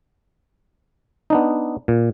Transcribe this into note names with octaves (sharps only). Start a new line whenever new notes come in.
B3 D4 D#4
A#2